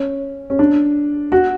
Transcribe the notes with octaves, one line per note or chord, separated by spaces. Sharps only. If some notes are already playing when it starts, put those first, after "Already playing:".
Already playing: C#4
C#4
D4
F#4